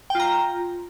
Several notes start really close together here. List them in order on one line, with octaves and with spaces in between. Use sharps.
G5 F4 A#5